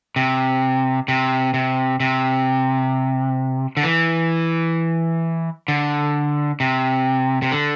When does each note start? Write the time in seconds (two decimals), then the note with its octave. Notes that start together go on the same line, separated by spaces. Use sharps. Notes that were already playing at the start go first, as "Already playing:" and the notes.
0.16 C3
1.08 C3
1.54 C3
2.00 C3
3.77 D3
3.83 E3
5.68 D3
6.60 C3
7.42 C3
7.51 D3